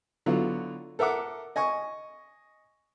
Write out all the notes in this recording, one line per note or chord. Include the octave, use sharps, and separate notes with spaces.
D3 F#3 B3 E4 F4
A4 A#4 E5 F#5 D6
D#5 G#5 C#6